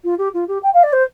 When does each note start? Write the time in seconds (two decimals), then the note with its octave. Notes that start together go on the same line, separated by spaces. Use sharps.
0.04 F4
0.18 G4
0.34 F4
0.48 G4
0.63 G5
0.74 F5
0.83 D5
0.93 C5